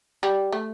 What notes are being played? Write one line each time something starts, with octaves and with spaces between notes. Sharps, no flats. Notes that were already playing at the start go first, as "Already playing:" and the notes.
G3
A3